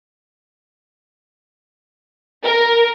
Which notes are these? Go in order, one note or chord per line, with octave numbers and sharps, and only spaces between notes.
A#4